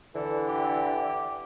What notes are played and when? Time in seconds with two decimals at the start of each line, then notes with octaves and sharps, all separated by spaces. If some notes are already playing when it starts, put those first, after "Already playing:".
0.15 D3 E3 A4
0.47 G4